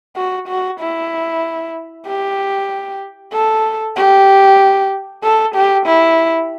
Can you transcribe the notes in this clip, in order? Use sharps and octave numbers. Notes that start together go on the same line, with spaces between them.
F#4
F#4
E4
G4
A4
G4
A4
G4
E4